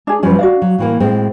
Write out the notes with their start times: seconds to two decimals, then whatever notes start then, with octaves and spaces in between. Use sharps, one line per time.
0.07 D4 G#4
0.23 F#2 F3 G3 C#4 B4
0.39 D4 F#4 D5 F5
0.62 F#3
0.78 A2 E3 A#3
1.00 A2 G#3 C4